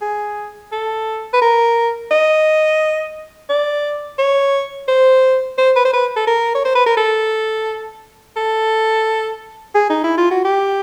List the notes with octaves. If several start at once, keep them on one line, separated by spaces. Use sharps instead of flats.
G#4
A4
B4
A#4
D#5
D5
C#5
C5
C5
B4
C5
B4
A4
A#4
C#5
C5
B4
A#4
A4
A4
G#4
D#4
E4
F4
F#4
G4